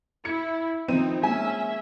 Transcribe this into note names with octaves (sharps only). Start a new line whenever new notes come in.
E4 G#6 C#7
D#3 F3 C4 D#4 D#7
G#3 A#3 C#4 E5 G#5